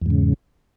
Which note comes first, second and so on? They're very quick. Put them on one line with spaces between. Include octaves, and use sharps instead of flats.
E2 G#2 C#3